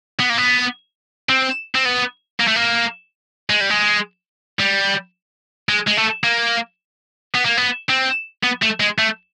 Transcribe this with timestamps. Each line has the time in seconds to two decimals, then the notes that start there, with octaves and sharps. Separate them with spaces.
0.20 B3
0.30 A#3
0.38 B3
1.29 C4
1.75 C4
1.85 B3
2.40 A#3
2.48 A3
2.56 A#3
3.50 G#3
3.61 G3
3.70 G#3
4.59 G3
5.69 G#3
5.87 G#3
5.97 A3
6.24 A#3
7.35 B3
7.45 A#3
7.57 B3
7.90 C4
8.43 B3
8.62 A3
8.80 G#3
8.98 A3